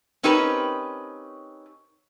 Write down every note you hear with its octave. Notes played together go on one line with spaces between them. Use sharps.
C4 C#4 D#4 G4 A#4 B4